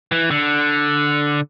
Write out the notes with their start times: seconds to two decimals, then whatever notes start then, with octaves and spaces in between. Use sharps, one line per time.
0.12 E3
0.31 D3